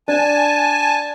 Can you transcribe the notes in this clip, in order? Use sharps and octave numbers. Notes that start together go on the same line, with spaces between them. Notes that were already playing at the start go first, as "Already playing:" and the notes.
D4 G#5 A5